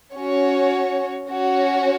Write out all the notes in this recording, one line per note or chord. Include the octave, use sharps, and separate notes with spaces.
C#4 F#4 C#5
C#4 F#4 C#5